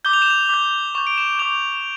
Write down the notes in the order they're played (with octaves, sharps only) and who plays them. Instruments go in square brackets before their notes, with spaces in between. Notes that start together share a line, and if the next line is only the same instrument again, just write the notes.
[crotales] D6 G6 G7
F7
E7
F7
D6 G6
C#6 G6 F7
D7
E7
D6 G6 F7